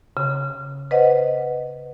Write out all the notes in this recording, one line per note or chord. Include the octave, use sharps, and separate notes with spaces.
C#3
B4 C5 D#5 F#5